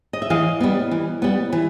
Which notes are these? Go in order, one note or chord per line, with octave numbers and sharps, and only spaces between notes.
D#5
E5
E3 D#5 F5
G3 B3
E3
G3 B3
E3